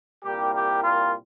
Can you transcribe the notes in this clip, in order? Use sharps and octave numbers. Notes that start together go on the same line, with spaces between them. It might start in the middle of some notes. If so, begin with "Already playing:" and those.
C2 A#2 G3 A#3 G4
G4
F4